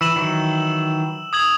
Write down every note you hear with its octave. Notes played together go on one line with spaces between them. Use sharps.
E3 E6 E7 F#7
D#3 E3 F#3
D#6 G#6 F#7